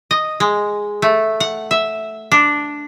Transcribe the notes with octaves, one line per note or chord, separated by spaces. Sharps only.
D#5
G#3
A3
F#5
E5
D4